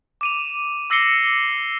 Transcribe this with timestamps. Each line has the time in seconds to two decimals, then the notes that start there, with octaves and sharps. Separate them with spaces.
0.21 D6 D#7 F7
0.90 D6 E6 A#6 C7 C#7 G7